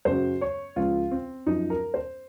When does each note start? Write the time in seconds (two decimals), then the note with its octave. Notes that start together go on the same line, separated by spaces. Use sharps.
0.05 F#2 C#3 F#3 C5
0.41 C#5
0.76 C#2 C#3 F3 F4
1.11 C4
1.46 F#2 F3 D#4
1.70 A#4
1.94 C5